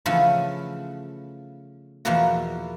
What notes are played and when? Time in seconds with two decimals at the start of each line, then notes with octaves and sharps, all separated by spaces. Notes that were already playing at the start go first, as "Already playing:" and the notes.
0.06 C#3 E3 F3 A3 B3 F4
2.05 E2 B2 F3 A#3 E4 F#4